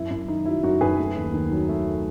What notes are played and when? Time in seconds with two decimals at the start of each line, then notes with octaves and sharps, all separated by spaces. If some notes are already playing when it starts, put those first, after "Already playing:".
Already playing: F#2 E4
0.10 F#2 E4
0.28 D#3 D#4
0.46 F#3 E4
0.63 F#2 D#4 F#4
0.81 F#2 G#4 B4
0.99 A3
1.17 D#2
1.34 D#3
1.52 F#3
1.69 A3